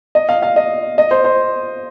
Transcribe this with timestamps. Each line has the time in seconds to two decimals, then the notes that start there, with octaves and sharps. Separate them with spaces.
0.15 D#5
0.29 F5
0.42 F5
0.56 D#5
0.98 D#5
1.11 C5
1.24 C5